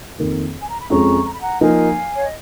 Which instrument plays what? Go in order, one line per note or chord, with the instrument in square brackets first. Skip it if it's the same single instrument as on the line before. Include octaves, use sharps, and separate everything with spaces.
[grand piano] F2 D#3 A#3
[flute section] G#5
A#5
B5
[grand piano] F2 F3 G#3 C#4 [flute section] A#5 C#6
[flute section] A#5
B5
F#5 A#5
[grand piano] F3 A#3 D#4 A#4 [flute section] F5 G#5
[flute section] C#5
D#5